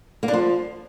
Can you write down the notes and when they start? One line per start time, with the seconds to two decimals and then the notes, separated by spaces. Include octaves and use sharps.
0.23 A#3
0.28 D4
0.33 F3